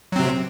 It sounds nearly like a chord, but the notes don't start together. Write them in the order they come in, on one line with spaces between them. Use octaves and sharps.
F#3 C4 C3